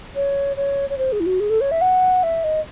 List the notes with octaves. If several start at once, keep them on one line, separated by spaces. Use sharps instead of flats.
C#5
C#5
C#5
C5
G#4
E4
F#4
G#4
A4
C#5
E5
F#5
E5
D#5